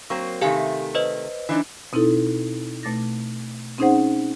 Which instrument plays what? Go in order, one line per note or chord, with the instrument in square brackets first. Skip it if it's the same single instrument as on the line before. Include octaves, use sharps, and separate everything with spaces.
[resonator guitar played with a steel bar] F#3 A#3 C4 [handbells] C#6
[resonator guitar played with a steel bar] C3 D#3 A3 [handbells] G4 F5 G#5
[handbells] B4 C5 D#5
[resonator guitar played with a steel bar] E3 D4 D#4
[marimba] B2 C4 D#4 E4 A4
B2 A3 D6 A6 A#6
C4 C#4 D#4 G#4 C5 F#5